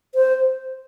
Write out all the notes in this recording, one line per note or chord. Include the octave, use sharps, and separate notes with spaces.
C5